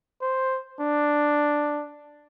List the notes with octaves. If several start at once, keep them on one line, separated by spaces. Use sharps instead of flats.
C5
D4